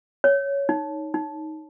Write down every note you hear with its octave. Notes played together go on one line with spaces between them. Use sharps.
C#5
D#4
D#4